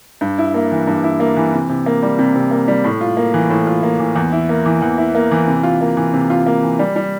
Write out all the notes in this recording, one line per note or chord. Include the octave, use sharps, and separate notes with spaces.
G2
E4
A#3
E3
G2
E4
A#3
E3
C3
C3
A#3
G3
C3
C3
A#3
G3
A2
F4
A#3
E3
A2
F4
A#3
E3
E2
E4
A#3
E3
E2
E4
A#3
E3
C3
F4
A#3
E3
C3
F4
A#3
E3
G3
G3